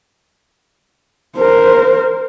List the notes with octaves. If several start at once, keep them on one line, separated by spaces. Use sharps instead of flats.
A#4 C5